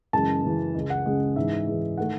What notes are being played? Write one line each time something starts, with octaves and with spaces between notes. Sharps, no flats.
F#2 C#3 E3 G#3 A5
F#2 C#3 E3 G#3
C#2 C#3 G#3
F#5
C#2 C#3 G#3
G#2 E3 G#3 E5
G#2 E3 G#3
D#3 A3 F#5